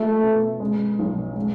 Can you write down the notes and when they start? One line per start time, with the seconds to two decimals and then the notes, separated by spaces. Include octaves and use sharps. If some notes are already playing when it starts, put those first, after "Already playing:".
Already playing: A3 F4
0.23 B2
0.60 G#3
0.99 B1
1.36 G#3